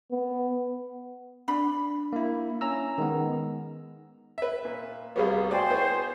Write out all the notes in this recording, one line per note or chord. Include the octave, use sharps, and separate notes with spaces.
B3
D4 B5
A#3 E4
C#4 A#5 E6
D#3 G#3 B3
B4 E5
A#2
C2 G3 B3 F#4 G#4 F5
F#4 C5 D5 G5 G#5
B3 E4 C#5 G#5